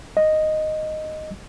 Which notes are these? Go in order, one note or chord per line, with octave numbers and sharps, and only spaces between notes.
D#5